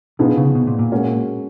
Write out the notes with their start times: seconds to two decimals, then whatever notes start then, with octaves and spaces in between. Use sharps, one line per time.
0.19 B2 F3 B3 D#4 G#4
0.37 C#3
0.55 B2
0.67 A#2
0.79 A#2
0.91 G#3 C#4 F#4 A#4